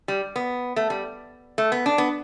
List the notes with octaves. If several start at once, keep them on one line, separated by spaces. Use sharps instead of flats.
G3
B3
A3
G3
A3
B3
D4
B3